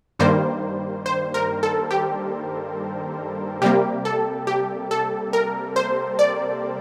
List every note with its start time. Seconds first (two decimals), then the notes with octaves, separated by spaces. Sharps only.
0.19 G2 D#3 G3 A#3 C5
1.06 C5
1.34 A#4
1.63 A4
1.91 G4
3.62 C3 G3 A#3 G4
4.05 A4
4.47 G4
4.91 A4
5.33 A#4
5.76 C5
6.19 D5